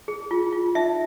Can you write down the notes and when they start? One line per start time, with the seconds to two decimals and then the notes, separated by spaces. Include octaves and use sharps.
0.08 G#4
0.31 F4
0.53 F4
0.75 D#4 E5